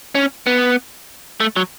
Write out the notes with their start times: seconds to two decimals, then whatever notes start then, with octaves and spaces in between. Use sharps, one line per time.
0.15 C#4
0.47 B3
1.40 A3
1.56 F#3